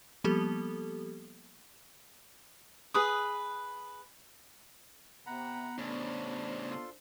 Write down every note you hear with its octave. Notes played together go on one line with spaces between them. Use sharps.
F3 G3 A#3 B3 G4 A4
G#4 B4 D#6
C3 B3 F#5 A#5 B5
A2 C#3 D4 C5 B5
F4 A4 C6